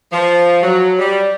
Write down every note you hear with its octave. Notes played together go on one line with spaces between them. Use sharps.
F3
F#3
G3